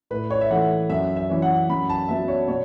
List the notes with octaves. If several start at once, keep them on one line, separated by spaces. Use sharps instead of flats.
A2 B4
C#5
E5
E3 A3 F#5
F#2 E5
E5
E3 C#4
F#5
F#2 B5
A5
F#3 B3 E5
C#5
B2 C#5